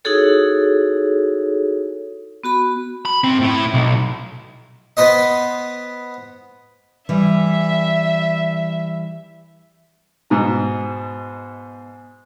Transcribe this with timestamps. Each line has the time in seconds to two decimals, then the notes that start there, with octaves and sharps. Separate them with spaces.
0.05 D#4 E4 F#4 G#4 A4 C#5
2.44 B3 F#4 B5
3.05 B5
3.24 G#2 C4
3.41 A2 E4
3.74 B1
4.97 B3 B4 C5 D#5
7.09 E3 G3 E5
10.30 G#2 B2 A#5